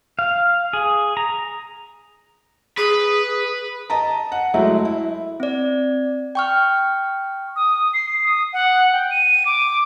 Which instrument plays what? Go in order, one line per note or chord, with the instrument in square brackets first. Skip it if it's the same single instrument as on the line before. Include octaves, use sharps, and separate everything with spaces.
[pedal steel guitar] F5
G#4
A#5
[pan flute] G#4 [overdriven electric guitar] B4
[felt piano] D#5 A5 A#5
F#5
F#3 G#3 A3 E4
E4
[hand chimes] C4 D5
G5 C#6 F6
[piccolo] D#6
C7
D#6
F#5
G5
D#7
D6